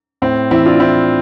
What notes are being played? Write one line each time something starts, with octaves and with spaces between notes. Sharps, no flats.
A2 C4
E3 C4 E4
D4 F4
A2 C4 E4